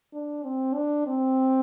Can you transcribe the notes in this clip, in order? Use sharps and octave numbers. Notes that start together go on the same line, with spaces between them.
D4
C4
D4
C4